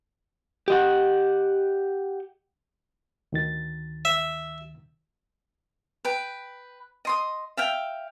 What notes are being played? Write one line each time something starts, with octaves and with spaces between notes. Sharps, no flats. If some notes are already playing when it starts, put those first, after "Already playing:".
G4 D#5 F#5
D2 D#3 A6
E5
B4 G5
D#5 C6 D#6
E5 F5 G5